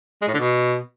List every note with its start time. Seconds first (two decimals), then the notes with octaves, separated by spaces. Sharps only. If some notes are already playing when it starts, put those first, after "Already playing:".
0.22 G#3
0.28 A2
0.34 D3
0.40 B2